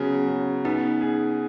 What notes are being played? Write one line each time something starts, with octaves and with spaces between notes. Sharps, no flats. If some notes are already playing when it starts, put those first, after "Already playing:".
Already playing: C#3 F#3 B3 F#4
C#3
B3 D#4
G#4